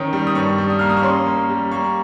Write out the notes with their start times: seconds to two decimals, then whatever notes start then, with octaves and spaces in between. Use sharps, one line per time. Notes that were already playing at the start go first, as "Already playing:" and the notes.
Already playing: D#3 C#4 D#6
0.13 G3
0.27 D#6
0.35 G2 C#6
0.58 G3
0.70 D#6
0.79 A#3 F6
0.90 D#6
0.97 C#6
1.03 C#4 C6
1.27 A#3
1.49 G3
1.71 A#3 C#6